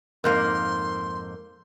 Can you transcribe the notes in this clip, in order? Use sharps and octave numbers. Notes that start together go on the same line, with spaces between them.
F2 G#2 A#3 A#4 C6 G6